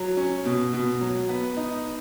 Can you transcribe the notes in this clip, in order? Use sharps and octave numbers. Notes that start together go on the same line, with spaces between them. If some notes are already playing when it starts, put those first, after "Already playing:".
Already playing: F#3
C#4
B2
B2
F#3
B3
D#4